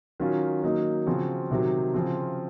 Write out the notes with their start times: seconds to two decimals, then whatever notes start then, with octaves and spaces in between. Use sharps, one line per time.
0.20 D#3 F#3 C#4 F4
0.63 D#3 F#3 A#3 D#4
1.07 C#3 F3 C4 F#4
1.51 C3 D#3 F#3
1.94 C#3 F3 C4